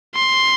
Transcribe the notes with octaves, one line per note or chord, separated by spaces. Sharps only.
C6